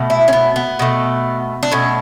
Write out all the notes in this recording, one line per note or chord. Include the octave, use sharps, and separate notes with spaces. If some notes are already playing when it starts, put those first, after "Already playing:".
Already playing: B2 A3
E4
C#4
B3
B3
B2 A3
D4
B2 A3 C#4